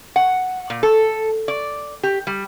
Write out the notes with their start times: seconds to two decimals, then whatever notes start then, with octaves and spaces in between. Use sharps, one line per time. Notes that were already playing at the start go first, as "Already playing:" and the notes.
0.16 F#5
0.70 A#2
0.83 A4
1.48 D5
2.03 G4
2.27 G3